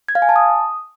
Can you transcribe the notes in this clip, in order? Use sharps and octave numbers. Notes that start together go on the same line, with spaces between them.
G#6
F5
G#5
A5
D#6